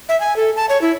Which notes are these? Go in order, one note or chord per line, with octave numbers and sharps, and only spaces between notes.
E5
G#5
A4
A5
C#5
E4